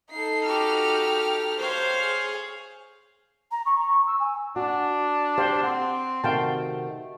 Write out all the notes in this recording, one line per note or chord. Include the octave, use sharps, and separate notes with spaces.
D#4 A4 C7
F#4 G4 D6 F6
C5 C#5 F5
G#4
A#5
C#6
A#5
C#6
E6
G#5
D4 F#4
G4 C5 F5
C4 F#5
C3 D#3 A3 F#4 F5 G5 A5